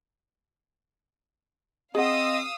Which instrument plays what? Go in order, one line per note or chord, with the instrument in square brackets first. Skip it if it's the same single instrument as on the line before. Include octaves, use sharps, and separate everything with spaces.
[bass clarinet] C4 [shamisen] G#4 F#5 [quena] D#5 [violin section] F5 D#6 E6